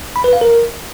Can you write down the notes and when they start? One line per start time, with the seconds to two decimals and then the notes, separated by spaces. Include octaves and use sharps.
0.16 B5
0.24 B4
0.33 F5
0.41 A#4